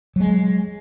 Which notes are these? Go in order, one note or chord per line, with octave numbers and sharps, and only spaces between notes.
F#3 G#3